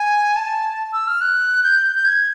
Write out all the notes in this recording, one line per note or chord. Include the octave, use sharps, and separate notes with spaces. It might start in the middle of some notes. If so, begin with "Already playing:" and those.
Already playing: G#5
A5
E6
F6
F#6
G6
G6
G#6